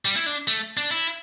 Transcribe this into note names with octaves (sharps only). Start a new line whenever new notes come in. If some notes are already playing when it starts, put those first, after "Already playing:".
G3
E4
D4
A3
D4
E4